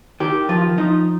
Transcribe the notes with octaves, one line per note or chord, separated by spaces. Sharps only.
D#3 G4
F3 F4
F3 D#4